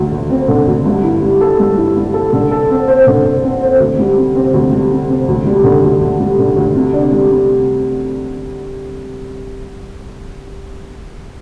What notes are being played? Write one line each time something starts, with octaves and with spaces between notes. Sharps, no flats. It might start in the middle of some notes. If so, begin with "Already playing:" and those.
Already playing: D2
D2
C4
D3
D2
G2
E4
G3
A4
G2
E4
G3
A4
D3
A4
C4
C5
D3
A4
C4
C5
D2
G3
C3
C4
D2
G3
C3
C4
D2
G3
D3
D2
D2
G3
D3
D2
C3
D4
G3
C3